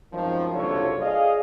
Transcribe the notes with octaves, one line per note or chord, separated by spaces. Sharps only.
G#1 F#2 D#3 F3
F#1 C2 D3 F4 A4 C#5
G#4 D5 D#5 F5